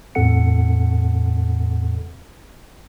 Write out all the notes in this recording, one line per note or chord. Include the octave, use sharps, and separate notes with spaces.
E2 A2 C4 A4 F#5 C#7